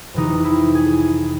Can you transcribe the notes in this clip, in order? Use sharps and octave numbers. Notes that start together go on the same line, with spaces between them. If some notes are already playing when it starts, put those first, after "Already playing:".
F2 C3 E3 D#4
E4
G#4